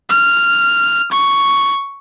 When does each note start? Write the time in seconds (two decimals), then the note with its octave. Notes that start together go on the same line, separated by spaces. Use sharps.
0.10 F6
1.12 C#6